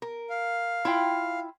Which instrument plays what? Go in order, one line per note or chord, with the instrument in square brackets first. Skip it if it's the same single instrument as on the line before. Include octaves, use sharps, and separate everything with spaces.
[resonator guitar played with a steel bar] A#4
[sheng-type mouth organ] F5
[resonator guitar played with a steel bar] E4 F4 G5